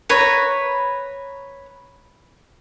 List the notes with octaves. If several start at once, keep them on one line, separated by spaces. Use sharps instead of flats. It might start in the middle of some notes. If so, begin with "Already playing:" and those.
B4 C#5 A#5